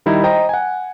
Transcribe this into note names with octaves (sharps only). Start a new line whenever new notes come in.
D#3 G3 D#4 E4
C5 D#5 G5 A#5
F#5 G#5